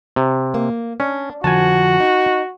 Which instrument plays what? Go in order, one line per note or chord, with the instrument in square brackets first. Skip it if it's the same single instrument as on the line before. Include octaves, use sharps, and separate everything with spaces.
[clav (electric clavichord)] C3
[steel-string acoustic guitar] A#3
[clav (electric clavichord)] C#4 [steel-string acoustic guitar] D4
[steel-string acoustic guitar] F2 D3 F3 [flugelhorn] F#4 [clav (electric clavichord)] G#5 A5
[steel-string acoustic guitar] D#4